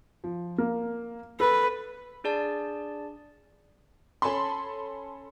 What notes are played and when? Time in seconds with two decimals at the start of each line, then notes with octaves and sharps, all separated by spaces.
0.24 F3
0.58 A#3
1.40 A4 B4
2.24 D4 G#4 D5 A5
4.22 C#4 A4 G#5 A5 B5 C6